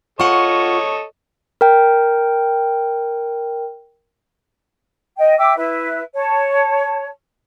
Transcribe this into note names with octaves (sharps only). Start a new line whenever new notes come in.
F4 A4 C#5 D#5 F#5 C#6
A#4 G5
D#5 G5
E5 G5 D6 E6
E4 B4 E5
C#5 A5